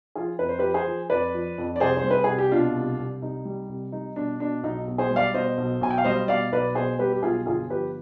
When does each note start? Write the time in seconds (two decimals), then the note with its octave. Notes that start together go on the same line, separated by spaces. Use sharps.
0.15 F3 F4 G#4
0.39 F2 B4
0.49 C5
0.59 F3 G4 B4
0.74 G#4 C5
0.87 F3
1.10 F2 B4 D5
1.34 F3
1.58 F2
1.76 D5
1.80 C2 G#4 C5
1.97 C5
2.04 G3
2.11 B4
2.24 C2 G#4
2.38 G4
2.51 B2 D4 F4
2.75 C2
2.99 C2
3.22 C2 D#4
3.45 G3
3.69 C2
3.92 G3 D#4
4.16 B2 D4
4.40 B2 D4
4.63 B1 D#4
4.88 B1
4.98 G#4 C5
5.11 G3
5.16 D5 F5
5.34 B2 C5 D#5
5.58 B1
5.81 B1 G#5
5.90 G5
5.98 F5
6.04 G3 C5 D#5
6.28 B2 D5 F5
6.52 B1 B4 D5
6.75 B2 G#4 C5
6.99 G3 G4 B4
7.13 G4
7.22 B1 F4 G#4
7.46 G1 F4 G#4
7.70 F3 G4 B4